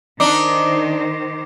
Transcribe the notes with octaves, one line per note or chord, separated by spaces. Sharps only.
D#3 D4 D#4 C5 D6